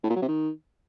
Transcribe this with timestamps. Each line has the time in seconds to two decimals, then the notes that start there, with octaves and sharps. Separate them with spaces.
0.04 A2
0.10 A#2
0.16 F#3
0.22 C3
0.28 D#3